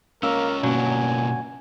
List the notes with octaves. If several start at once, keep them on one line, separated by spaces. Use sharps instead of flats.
A#3 C#4 F4 A#4 E6
G1 B2 F#3 A#3 C#4 F#4 G#5